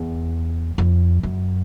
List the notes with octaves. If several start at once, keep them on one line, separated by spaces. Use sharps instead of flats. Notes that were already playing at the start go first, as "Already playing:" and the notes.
Already playing: E2
F2
F#2